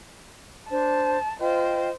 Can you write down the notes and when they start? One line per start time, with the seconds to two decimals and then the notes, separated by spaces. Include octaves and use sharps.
0.70 D4 C5 A5
1.40 F4 C5 D#5 G5